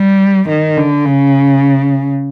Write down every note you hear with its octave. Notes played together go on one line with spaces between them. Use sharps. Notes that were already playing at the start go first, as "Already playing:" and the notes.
Already playing: G3
D#3
D3
C#3